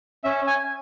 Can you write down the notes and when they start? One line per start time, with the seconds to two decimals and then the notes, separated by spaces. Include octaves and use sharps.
0.24 C#4 E5
0.47 G#5